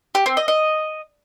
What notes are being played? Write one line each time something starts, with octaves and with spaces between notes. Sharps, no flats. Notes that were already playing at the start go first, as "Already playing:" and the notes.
G4
C4
D#5
D#5